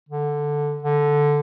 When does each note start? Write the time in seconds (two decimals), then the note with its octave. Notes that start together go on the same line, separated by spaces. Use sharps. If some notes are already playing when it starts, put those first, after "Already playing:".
0.09 D3
0.83 D3